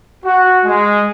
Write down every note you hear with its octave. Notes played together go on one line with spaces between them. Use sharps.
F#4
G#3